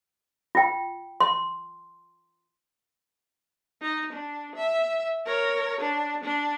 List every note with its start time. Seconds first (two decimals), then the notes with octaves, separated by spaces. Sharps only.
0.55 F4 G5
1.21 C6
3.82 D#4
4.12 D4
4.56 E5
5.25 A#4 C#5
5.81 D4
6.23 D4